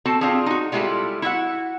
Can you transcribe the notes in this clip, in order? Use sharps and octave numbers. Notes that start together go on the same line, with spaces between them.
C4 F#4 A4 A5
C4 D4 F4 G4 G#4
D#4 F#4
G3 G#3 E4 F4 G4 A4
E4 F#4 E5 F#5